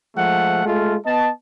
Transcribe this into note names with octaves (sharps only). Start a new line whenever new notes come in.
F3 G#3 A3 F#5
G#3 A3 F4
B3 D#5 A5